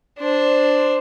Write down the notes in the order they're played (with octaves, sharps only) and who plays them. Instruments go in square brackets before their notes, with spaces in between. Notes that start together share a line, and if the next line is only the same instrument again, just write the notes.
[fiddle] D4 C5